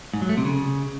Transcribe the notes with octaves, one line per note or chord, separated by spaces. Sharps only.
G#2
F#3
A3
C3
C#3